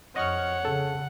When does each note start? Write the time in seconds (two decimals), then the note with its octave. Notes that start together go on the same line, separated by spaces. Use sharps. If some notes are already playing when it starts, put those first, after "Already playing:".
0.16 F2 C#5 D#5 F#5 C#6 F6
0.65 C#3 A4